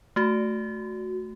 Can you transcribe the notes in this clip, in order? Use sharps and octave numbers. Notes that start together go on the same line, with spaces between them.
A3 F#4